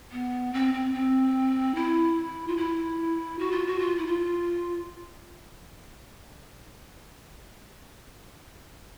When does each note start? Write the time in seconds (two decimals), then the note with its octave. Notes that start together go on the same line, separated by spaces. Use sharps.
0.12 B3
0.53 C4
0.74 C4
0.94 C4
1.75 E4
2.48 F4
2.57 E4
3.39 F#4
3.51 F4
3.66 F#4
3.79 F4
3.98 E4
4.07 F4